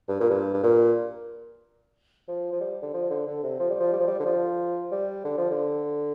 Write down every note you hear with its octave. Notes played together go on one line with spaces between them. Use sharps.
G2
A#2
G2
G2
A#2
F3
F3
G3
D3
F3
D3
D3
C3
F3
G3
F3
G3
F3
G3
D3
F3
G3
D3
F3
D3